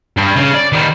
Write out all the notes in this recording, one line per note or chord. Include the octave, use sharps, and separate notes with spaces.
G2
C#3
D5
D#3 G3